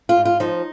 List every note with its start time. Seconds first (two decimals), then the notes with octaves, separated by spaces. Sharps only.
0.09 F4
0.16 G#2
0.25 F4
0.40 F3 D#4